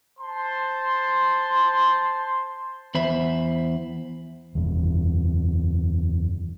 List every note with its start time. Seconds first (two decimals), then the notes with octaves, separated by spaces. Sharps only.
0.19 C5 A5 C6
2.95 E2 C5 E5 B5
4.55 F#1 E2